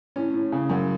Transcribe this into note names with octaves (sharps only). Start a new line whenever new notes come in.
A2 C#4
A2
C#3
F#2